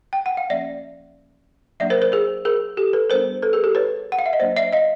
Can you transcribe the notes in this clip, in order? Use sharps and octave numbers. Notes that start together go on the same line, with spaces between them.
G5
F#5
F5
F3 A#3 C#4 D5 E5
F#3 A#3 D4 D5 E5
A#4 C5
A#4 C5
G#4 A#4
G#4 A#4
G4 A4
A4 B4
G3 B3 D4 A#4 C5
A4 B4
G#4 A#4
G4 A4
B4 C#5
F#5
F5
E5
D#5
F#3 A#3 D4 C5 D5
D5 E5
D#5 F5